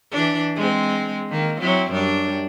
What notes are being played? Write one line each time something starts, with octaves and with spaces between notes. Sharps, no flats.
E3 D4
G#3 C4
D#3 A#3
F#3 C4 E4
F#2 G3 D4